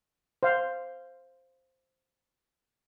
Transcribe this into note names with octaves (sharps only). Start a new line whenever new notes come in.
C5 F5